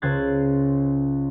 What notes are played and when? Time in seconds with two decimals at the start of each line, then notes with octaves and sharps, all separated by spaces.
0.02 C#2 C5 F#6 G#6 A6